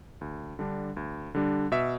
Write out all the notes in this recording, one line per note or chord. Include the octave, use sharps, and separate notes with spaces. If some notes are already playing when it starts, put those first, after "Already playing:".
D2
D3 G3 D4
D2
D3 G3 D4
B2 E5